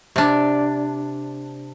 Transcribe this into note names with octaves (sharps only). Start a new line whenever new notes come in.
C3 D4